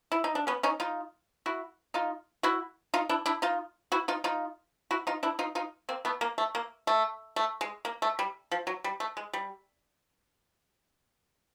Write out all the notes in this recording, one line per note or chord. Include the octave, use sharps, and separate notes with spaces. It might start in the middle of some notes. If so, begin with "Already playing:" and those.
E4
D#4
D4
B3 C#4
C#4 D#4
D#4 F4
E4 F#4
D#4 F4
E4 F#4
D#4 F4
D4 E4
D4 E4
D#4 F4
E4 F#4
D#4 F4
D#4 F4
E4 F#4
D#4 F4
D4 E4
D#4 F4
D#4 F4
A#3 C4
A3 B3
A#3
A3
A#3
A3
A3
G#3
A#3
A3
G3
F3
F#3
G3
A3
G#3
G3